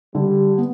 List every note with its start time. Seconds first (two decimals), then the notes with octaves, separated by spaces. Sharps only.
0.14 D3 G3
0.58 B3